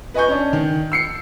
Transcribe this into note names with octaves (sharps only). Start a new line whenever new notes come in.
B4 D#5 G#5 C#6 G6
C#4 D4
D#3
E6 C7 C#7